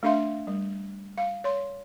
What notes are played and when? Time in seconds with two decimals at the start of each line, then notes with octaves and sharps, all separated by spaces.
0.03 A3 D4 E5 F5 C6
0.47 G3
1.18 F5
1.44 C#5 C6